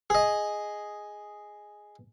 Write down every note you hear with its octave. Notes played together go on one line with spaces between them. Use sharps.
G#4 D#5